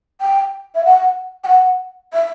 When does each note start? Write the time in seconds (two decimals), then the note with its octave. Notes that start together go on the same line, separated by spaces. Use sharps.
0.21 G5
0.75 E5
0.85 F#5
1.44 G5
1.48 F#5
2.13 E5